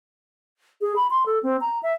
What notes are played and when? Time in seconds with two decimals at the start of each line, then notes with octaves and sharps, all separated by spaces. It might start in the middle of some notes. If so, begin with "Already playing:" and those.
0.81 G#4
0.96 B5
1.10 C6
1.26 A4
1.43 C4
1.61 A#5
1.83 E5